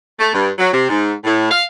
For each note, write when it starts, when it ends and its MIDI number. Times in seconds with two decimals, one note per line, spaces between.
0.20 0.30 57
0.33 0.49 43
0.59 0.71 54
0.73 0.85 48
0.89 1.13 44
1.24 1.50 45
1.51 1.64 77